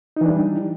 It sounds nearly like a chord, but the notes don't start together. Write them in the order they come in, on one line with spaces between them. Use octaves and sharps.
D#4 E3 D4 G3